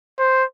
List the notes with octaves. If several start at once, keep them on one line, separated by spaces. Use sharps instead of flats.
C5